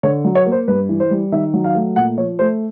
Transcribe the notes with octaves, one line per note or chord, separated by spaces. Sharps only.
D3 C#5
F#3
C#5
A#3
C5
G2 B4
E3
C5
G3
D#3 E5
F#3
F5
A3
A#2 F#5
F3 C#5
A3 C5